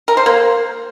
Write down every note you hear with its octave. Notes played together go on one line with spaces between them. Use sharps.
A#4
C5
A#3